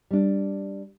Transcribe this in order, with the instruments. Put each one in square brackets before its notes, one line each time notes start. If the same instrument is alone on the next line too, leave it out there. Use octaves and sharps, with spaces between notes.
[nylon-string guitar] G3 D4